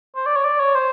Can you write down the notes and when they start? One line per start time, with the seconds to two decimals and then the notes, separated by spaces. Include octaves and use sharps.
0.16 C5
0.26 D5
0.36 C#5
0.45 D5
0.60 C#5
0.75 C5